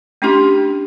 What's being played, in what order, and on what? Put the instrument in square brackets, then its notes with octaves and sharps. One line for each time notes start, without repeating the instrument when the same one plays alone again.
[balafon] A3 C#4 D4 E4 G4 C6